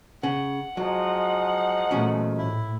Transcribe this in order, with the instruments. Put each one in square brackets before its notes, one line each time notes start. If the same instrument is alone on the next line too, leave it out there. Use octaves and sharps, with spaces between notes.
[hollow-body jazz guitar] C#3 [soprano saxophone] F#5
[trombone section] F3 G#3 D#4 [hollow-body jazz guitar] F#3
[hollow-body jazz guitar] E2 F#3 C#4 [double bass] A#2 A3
[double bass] A2 [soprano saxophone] E4